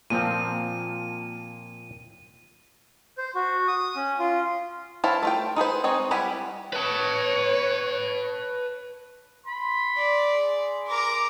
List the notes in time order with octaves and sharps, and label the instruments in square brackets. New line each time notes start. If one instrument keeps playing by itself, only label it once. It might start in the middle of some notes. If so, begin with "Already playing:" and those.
[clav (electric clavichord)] A#2 F3 C4 [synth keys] A#3 A5 [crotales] D#7
[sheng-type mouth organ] C5
F#4
D#6
C#4
F4
[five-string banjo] E4 C5 C#5 F5 A5
A3 F4 G5
D#4 G#4 B4 C5
G#3 C4 C#5 D#5
G3 E4 G4 F#5 G#5
[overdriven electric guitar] B4 A5 [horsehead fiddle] C#5
[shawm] B5 [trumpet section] C6
[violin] D5
[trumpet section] G#4 C6
[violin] A#4 A#5 [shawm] D6